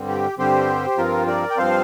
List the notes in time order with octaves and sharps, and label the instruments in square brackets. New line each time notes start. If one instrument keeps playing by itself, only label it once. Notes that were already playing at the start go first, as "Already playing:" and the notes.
Already playing: [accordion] G2 D3 G3 C4
G4
G2 D3 G3 C4 G4 C5
G2 F3 C4 F4 A#4
A#4 D5
G5
G2 F3 C4 C5 F5